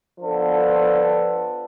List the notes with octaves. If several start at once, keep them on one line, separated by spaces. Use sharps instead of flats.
F3 B3 D4 A4